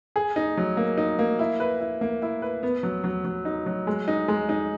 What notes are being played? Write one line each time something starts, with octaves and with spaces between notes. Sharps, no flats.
G#4
D#4
F#3
A#3
D#4
A#3
E4
B4
E4
A#3
E4
B4
B3
F#3
F#3
F#3
D#4
F#3
G#3
D#4
G#3
D#4